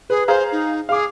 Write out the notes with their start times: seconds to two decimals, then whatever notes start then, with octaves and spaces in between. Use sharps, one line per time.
0.10 G#4 B4
0.28 G#4 C5 F5 A#5
0.52 D#4
0.89 G#4 F5 D6